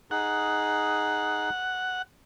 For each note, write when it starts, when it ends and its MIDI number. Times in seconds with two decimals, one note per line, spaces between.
0.11 1.50 63
0.11 1.50 68
0.11 2.02 78